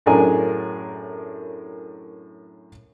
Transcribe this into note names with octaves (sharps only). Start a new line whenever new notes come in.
F#2 A2 D4 G#4 A#4 G#5